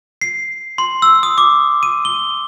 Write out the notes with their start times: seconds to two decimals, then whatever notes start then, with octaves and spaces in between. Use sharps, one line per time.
0.21 C7
0.78 C6
1.02 E6
1.23 D#6
1.38 D6
1.83 D#7
2.05 G7